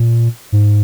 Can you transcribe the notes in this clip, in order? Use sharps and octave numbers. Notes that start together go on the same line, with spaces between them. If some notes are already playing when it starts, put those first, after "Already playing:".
Already playing: A#2
G#2